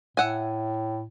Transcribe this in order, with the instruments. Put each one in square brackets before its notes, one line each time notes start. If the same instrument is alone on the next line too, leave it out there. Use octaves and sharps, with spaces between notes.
[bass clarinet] A2 [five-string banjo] E5 F#5 G#5